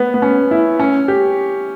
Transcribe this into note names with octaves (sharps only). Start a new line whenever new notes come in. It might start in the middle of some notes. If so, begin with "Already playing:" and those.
Already playing: B3
B3
C#4
E4
C#4
G4